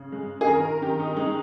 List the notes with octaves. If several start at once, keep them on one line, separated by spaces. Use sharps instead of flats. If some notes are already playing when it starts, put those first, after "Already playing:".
Already playing: C#3
G#3
G#4
D#3 A#4
A#4
D#3 G4
D#4
G#3 D#4